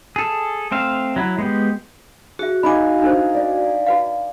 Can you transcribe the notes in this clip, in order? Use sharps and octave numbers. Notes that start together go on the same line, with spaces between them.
G#4 A4
A3 C4 E5 F5
F#3 E4
G#3 B3 G4
F#4 G#4 E5
D#4 F5 G#5 B5 D6
D4 A4 C5
D5
F#4 B4 F5